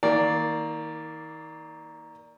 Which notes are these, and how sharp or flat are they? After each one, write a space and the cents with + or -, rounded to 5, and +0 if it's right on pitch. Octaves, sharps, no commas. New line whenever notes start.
D#3 +40 A#3 +0 D5 +0